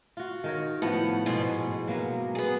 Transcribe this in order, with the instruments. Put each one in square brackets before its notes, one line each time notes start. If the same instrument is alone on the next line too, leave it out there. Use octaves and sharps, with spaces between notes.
[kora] F4 F#4
D#3 A#4 C#5
[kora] A2 F3 B3 [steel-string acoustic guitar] F#5
[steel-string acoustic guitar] G#2 B2 G#3
[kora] F#3 A#3 B3
[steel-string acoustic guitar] B3 G#4